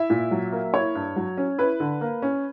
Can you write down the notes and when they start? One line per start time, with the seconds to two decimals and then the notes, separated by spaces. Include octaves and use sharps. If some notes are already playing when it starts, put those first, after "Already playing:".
Already playing: E4 E5
0.10 A#2
0.31 F#3
0.52 A#3
0.74 E4 C#5
0.95 G2
1.16 F#3
1.37 C#4
1.58 E4 B4
1.80 D3
2.01 A#3
2.22 C#4